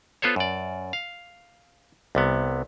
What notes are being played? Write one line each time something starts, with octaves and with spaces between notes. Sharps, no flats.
B3 F4 A4 C5 C#5
F#2 D5
F5
C2 C3 B3